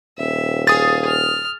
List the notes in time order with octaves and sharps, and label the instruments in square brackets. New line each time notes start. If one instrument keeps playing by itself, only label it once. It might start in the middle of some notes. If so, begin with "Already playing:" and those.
[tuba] D#1 [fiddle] E5
[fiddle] G#4 F5 [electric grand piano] D#6 A6
[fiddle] F6